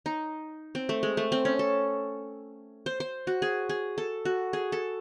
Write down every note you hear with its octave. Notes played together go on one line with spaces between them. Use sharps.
D#4
C4
A3
G#3
A3
C4
C#4
A4
C5
C5
F#4
G#4
G#4
A4
F#4
G#4
A4